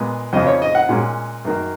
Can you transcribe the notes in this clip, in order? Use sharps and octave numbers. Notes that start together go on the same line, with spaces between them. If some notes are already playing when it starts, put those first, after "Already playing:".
Already playing: A#2 G#3 B3
F2 C#3 F3 D#5
C#5
D#5
F#5
A#2 G#3 C#4
F#2 D#3 A#3